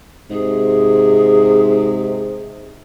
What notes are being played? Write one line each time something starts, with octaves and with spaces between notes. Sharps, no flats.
G#2 C3 G#4